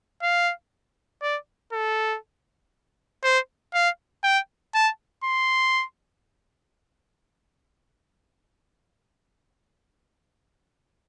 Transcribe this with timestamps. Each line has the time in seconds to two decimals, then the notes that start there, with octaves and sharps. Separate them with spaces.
0.23 F5
1.22 D5
1.73 A4
3.24 C5
3.74 F5
4.24 G5
4.75 A5
5.24 C6